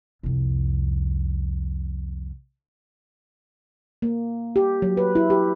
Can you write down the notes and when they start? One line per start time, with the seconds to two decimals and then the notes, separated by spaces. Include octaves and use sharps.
0.23 C2 F2
4.02 A#3
4.56 G4
4.82 F#3
4.97 B4
5.15 E4
5.30 G4